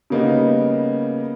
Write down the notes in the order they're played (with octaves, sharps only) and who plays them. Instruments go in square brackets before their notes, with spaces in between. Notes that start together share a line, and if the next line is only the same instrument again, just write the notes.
[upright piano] C#3 G3 A#3 B3 D#4